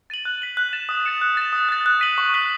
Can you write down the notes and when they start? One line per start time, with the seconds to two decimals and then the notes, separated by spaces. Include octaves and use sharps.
0.10 A6 D#7 F#7
0.25 F#6
0.42 B6 F#7
0.57 F#6
0.73 A6 E7
0.89 D#6
1.05 A6 C#7 E7
1.21 F#6
1.37 A6 E7
1.53 D#6
1.69 F#6 A6
1.86 F#6
2.01 B6 D#7 F#7
2.18 C#6
2.34 F#6 B6 F#7